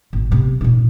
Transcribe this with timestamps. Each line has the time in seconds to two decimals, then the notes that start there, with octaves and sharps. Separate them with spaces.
0.13 G#1
0.31 C3 B3
0.61 A#2 D#4